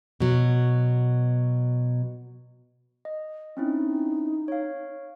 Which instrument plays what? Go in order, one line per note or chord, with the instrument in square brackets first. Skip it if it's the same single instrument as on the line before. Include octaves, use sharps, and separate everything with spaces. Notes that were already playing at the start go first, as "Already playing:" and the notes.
[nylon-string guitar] B2 F#3
[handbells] D#5
[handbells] C4 C#4 E4 [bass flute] D#4
[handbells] C#5 F5